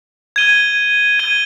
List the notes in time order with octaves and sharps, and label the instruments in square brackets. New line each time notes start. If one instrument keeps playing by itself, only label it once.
[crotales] G#6 D#7 G7
G#6 D#7 G7